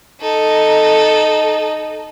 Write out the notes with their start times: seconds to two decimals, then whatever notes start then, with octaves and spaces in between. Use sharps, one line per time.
0.21 D#4 A4